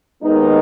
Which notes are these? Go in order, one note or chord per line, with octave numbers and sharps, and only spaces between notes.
D#2 D#3 G#3 B3 D#4